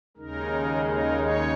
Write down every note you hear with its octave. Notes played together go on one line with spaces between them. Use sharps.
D#2 C#3 G#3 D#4 A#4
A#4
C#5